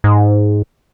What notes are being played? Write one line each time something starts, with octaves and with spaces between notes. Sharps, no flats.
G#2